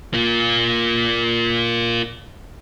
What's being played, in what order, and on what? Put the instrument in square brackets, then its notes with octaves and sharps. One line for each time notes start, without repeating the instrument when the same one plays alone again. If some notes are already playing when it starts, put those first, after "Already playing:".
[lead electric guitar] A#3 F4